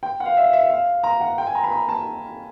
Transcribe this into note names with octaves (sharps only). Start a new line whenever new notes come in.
G5
F#5
F5
E5
E5
F5
A#5
F#5
G5
G#5
A#5
B5
A#5
A5